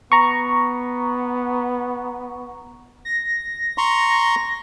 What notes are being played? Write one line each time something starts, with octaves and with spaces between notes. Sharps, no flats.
B3 A#5 C#6
A#6
A#5 C6 C#6